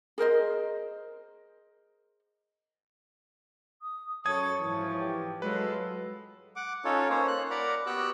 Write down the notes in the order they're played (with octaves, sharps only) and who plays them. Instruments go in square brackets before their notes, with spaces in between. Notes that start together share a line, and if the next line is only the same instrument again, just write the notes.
[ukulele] G#4 A#4 C5 D#5
[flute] D#6
[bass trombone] F#2 [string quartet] A4 A6 [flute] C#5 [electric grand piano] D#6 G#6
[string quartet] G#2 F3 [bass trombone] E3
[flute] G4
[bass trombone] F#3 [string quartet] G#3 F4 [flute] A4 [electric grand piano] B4
[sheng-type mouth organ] F#5 D6
C#4 D#4 F4 A4 C#5
A#3 C#4 C5 C#5
F#6
A#4 D5 F#5 A#5 B5
B3 F#4 G4 G5 E6 F#6